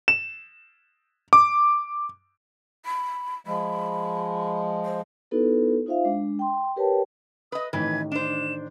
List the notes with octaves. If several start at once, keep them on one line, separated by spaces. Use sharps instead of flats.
E7
D6
B5
F3 G#3 B5
C5
B3 D#4 E4 F#4 A4 B4
D#4 F4 C5 E5 F5
G#3 D4
G5 C6
G4 A#4 B4 C#5 G5 A5
B4 D#5 D#6
A1 F2 D#3 E3 B4 G#6
D4 C5 E7